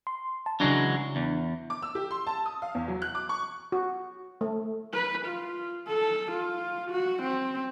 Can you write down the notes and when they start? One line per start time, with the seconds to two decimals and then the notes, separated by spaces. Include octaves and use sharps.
0.07 C6
0.46 A5
0.60 C#3 E3 F#3 G#3 D4
1.16 E2
1.70 D6
1.82 E6
1.95 G4
2.11 C6
2.27 A5
2.46 D#6
2.62 F5
2.75 E2
2.88 F#3
3.02 F#6
3.15 D6
3.29 C#6
3.72 F#4
4.41 A3
4.94 B4
5.26 F4
5.88 A4
6.32 F4
6.91 F#4
7.23 C4